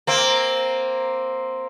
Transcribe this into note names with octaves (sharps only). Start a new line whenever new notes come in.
A#3 C4